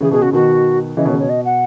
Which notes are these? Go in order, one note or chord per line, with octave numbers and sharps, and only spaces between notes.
C#3 E3 G#4
B2 G#4
C#3 F#4
B2 D#3 F#4
C#3 E3 D#5
B2 D#3 C#5
C#3
B2 C#5
D#5
F#5